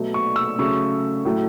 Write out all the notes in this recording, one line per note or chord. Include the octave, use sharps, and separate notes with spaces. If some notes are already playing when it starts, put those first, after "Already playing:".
Already playing: B2 F#3 A3
C#6
E6
C#3 F#3 A3 C#6
A2 F#3 A3